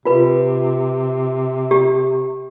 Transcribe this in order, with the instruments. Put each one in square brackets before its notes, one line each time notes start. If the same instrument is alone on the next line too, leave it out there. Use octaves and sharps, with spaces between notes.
[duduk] C3 [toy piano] F4 B4
[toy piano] G4